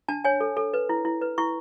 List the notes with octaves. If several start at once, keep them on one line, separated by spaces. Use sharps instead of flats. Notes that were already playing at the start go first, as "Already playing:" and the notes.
D4 A5
C#5 G#5
A4
A4
B4
E4
E4
B4
E4 C#6